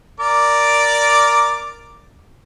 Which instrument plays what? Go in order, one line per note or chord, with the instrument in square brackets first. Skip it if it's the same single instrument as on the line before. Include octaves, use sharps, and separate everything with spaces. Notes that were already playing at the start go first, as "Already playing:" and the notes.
[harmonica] A#4 D5 D6